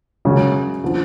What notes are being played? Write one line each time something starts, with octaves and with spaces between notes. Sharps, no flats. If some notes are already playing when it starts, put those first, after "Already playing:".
F#2 C#3 G#3 C#4
D3 F3